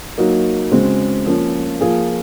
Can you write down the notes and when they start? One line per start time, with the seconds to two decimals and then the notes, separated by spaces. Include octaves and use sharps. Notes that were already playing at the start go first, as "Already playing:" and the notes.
0.18 F#3 A#3 D#4 F#4
0.72 C#3 G#3 C4 F#4
1.26 F3 A#3 C#4
1.81 F3 A#3 F4 G#4